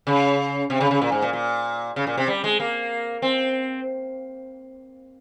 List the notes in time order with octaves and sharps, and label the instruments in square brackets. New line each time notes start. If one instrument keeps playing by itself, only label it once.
[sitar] C#3
C3
C#3
C#3
A#2
G#2
A#2
A#2
C#3
A#2
C3
G3
G#3
A#3
C4